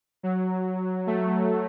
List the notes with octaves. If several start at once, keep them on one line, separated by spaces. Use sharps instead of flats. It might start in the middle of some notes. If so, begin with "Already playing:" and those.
F#3
A3